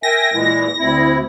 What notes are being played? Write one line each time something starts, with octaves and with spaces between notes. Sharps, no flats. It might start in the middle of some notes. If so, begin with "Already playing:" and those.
A#4 E5 G5 G#5 A#6
A#2 E3 G#3 E4
D2 C4 E4